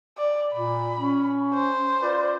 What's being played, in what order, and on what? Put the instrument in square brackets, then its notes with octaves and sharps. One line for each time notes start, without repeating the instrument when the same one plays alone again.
[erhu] D5
[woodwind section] A#2 [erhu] B5
[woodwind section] C#4
[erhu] C5
[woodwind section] F4 B4 D5